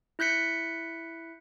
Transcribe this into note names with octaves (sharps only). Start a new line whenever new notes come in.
E4 F#6 G6 B6 C#7